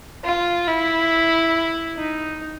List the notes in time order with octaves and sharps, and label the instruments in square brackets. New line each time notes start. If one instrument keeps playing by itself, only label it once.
[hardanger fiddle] F4
E4
D#4